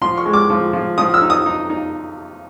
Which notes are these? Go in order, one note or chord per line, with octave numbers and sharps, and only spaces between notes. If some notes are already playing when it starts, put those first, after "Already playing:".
F3 C6
C#6
G#3
D6
F3
F3
F3 D#6
E6
D#4
D#6
D#4
D#4